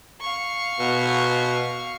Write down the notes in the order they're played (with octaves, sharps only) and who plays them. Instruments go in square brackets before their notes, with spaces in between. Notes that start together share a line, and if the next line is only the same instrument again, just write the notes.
[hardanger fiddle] F5 C#6
[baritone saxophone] B2